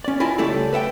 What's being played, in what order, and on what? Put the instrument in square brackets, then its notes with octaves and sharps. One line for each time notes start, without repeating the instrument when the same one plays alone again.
[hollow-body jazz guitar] C#4 D5
E4 F4 D#5 G#5 A5
C#2 G3 A3 A4 D5
B4 E5 F#5 G5